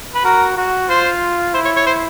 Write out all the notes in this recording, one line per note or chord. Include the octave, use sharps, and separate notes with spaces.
B4
F#4 A#4
F#4
F4 C5
E4 C5
C#5
C#5
C5